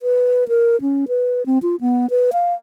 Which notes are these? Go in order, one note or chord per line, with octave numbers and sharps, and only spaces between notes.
B4
A#4
C#4
B4
C4
F4
B3
B4
F5